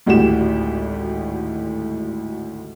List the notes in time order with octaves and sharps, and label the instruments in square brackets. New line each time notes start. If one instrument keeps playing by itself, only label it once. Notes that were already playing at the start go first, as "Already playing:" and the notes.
[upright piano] G#1 D2 A2 F#4 G4 E7